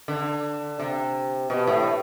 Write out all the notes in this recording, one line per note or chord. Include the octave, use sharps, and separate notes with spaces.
D3
C3
B2
A2